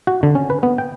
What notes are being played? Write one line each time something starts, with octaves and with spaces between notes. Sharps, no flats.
F#4
D3
C#4
B4
B3
G5